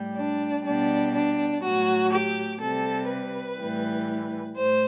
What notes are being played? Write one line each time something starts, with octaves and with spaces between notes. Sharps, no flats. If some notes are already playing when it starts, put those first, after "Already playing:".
Already playing: A2 G3
D4
B2 G3 D4
D4
A2 F#3 F#4
G4
C3 G3 A4
B4
A2 E3 G3
A2 C5